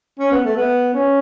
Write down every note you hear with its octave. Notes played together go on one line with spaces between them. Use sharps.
C#4
B3
A3
B3
C#4